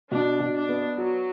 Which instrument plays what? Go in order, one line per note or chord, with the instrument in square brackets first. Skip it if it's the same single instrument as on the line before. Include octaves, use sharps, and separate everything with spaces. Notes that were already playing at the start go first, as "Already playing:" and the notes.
[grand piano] B2 [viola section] D4
[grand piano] B2
[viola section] D4
[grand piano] B3
[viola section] F#3 [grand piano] F#4